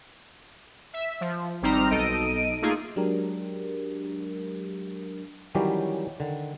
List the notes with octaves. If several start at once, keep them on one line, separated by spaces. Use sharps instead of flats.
E5
F3
G#1 G3 C4 D#4 A#5 F6
B1 D#4 A4 D#5 D7 D#7
A3 A#3 D#4 F4 G#4
F#3 G#3 D4 G4 A#4
D#3 E3 F#3 G3 C#4 G4
D3 D#3